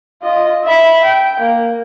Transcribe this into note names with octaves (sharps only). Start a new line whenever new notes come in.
F4 D#5
E5 B5
G5
A#3